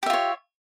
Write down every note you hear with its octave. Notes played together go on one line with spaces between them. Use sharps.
F4 G4 C#5 E5